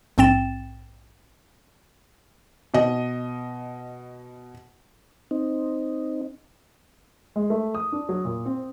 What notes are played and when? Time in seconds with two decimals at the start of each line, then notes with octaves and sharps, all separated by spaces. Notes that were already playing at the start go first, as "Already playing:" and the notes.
0.18 A#1 G#2 C4 G5 A6 E7
2.74 B2 D#5
5.31 C4 D#4
7.36 G#3
7.50 A3
7.75 D#6
7.92 D4
8.09 F#3
8.25 A#2
8.45 C4